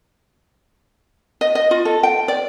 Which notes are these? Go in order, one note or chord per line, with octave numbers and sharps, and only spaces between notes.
D#5
D#5
F4
A4
G5
D5